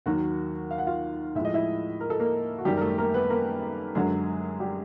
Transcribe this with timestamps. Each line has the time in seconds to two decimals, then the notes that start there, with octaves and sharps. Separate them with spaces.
0.06 D#2 D#3 F#3 F#4 F#5
0.71 F5
0.78 F#5
0.87 F4 F5
1.35 A2 F3 G#3 E5
1.45 D#5
1.53 E4 E5
2.01 A#4
2.10 A4
2.20 A#3 A#4
2.58 F#4
2.65 F#2 D#3 G3 G4
2.77 A#4
2.82 A3 A4
2.98 A#3 A#4
3.14 B3 B4
3.30 A#3 A#4
3.95 F#2 D3 F#3 G#3 G#4
4.60 G3 G4